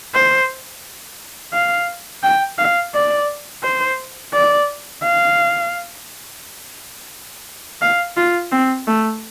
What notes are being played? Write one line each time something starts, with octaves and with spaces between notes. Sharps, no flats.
C5
F5
G5
F5
D5
C5
D5
F5
F5
F4
C4
A3